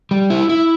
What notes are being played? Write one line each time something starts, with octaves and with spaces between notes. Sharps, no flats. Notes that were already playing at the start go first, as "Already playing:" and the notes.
G3
E4
E4